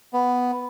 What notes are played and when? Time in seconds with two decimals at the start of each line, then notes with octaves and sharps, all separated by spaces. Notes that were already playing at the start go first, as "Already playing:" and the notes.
0.13 B3